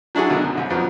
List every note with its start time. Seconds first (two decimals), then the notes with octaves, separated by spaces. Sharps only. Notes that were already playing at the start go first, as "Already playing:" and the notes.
0.15 F#3 D4 E4 F#4 G#4
0.29 B2 D3 D#3 F#3
0.44 F#2
0.57 C2
0.70 F2 F3 F#3 B3